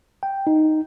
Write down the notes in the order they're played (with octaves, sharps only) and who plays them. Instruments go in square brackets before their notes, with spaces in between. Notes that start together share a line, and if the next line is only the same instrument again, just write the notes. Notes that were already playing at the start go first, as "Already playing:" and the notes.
[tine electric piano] G5
D#4